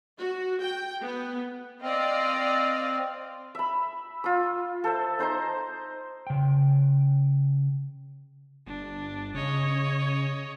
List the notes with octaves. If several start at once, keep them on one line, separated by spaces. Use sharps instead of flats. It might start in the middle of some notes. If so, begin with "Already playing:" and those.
F#4
G5
B3
C4 D5 D#5 F5
E5 B5
F4 E6
A4 C5 E5
D#4 C5 A#5 C6
C#3 G5
G1 D4
C#3 C#5 D#5